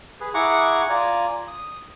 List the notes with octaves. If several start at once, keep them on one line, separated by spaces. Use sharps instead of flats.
G#4 B4
E4 G#4 F#5 A#5 C#6 D6
F4 D5 G#5 A#5
D#6